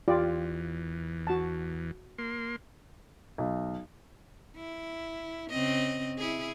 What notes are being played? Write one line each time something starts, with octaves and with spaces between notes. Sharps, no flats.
E2 F4 G4 D5
F#4 A5
A#3 C6
B1
E4
C#3 C4 D#5
E4 G#4